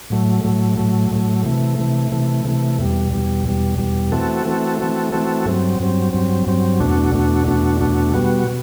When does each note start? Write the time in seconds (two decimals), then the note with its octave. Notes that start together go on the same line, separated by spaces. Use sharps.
0.10 A2 F#3 A3
0.44 A2 F#3 A3
0.77 A2 F#3 A3
1.11 A2 F#3 A3
1.45 C3 E3 A3
1.78 C3 E3 A3
2.12 C3 E3 A3
2.45 C3 E3 A3
2.78 E2 B2 G3
3.12 E2 B2 G3
3.45 E2 B2 G3
3.78 E2 B2 G3
4.12 E3 A3 C4 F#4 A4
4.46 E3 A3 C4 F#4 A4
4.79 E3 A3 C4 F#4 A4
5.12 E3 A3 C4 F#4 A4
5.46 G2 F#3 C4
5.79 G2 F#3 C4
6.13 G2 F#3 C4
6.46 G2 F#3 C4
6.80 E2 B2 A3 D4 F#4
7.13 E2 B2 A3 D4 F#4
7.47 E2 B2 A3 D4 F#4
7.80 E2 B2 A3 D4 F#4
8.14 B2 G3 B3 F#4
8.47 B2